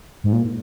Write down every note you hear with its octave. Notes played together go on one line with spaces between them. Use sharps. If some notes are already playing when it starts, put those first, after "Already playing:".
G#2
A#2